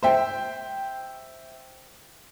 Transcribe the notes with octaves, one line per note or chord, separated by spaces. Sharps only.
C5 E5 G5